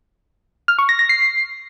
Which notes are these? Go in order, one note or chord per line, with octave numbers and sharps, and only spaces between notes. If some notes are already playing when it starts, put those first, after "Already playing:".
F6
C#6
A#6
A#6
C7